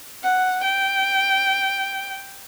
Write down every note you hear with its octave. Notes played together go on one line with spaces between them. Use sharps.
F#5
G5